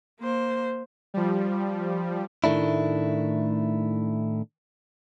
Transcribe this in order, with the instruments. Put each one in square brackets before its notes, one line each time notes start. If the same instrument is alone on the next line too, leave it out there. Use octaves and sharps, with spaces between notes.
[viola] A#3 C5
[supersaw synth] F3 G3
[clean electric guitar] A2 D#3 A3 D4 E4